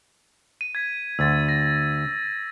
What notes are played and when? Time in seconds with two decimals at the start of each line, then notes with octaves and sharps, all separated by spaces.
0.61 D#7
0.75 G#6 B6
1.19 D2 E6 A6
1.49 A#6